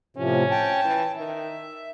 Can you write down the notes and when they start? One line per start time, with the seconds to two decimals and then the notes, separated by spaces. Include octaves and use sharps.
0.17 A2 C3 F3 C#4
0.51 G5 A5
0.85 E3
1.16 D#3 E5